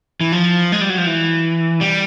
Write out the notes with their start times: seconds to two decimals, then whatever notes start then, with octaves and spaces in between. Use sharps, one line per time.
0.21 E3
0.32 F3
0.72 G#3
0.81 G3
0.89 F#3
0.98 F3
1.06 E3
1.81 G3